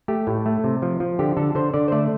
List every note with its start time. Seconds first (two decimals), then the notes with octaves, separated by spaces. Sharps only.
0.08 A3 G4
0.27 A2
0.46 A3
0.64 C3
0.82 F3
1.00 F3
1.19 D3 G4
1.37 D3 A4
1.55 D3 C5
1.74 D3 D5
1.88 C5
1.92 A3 D5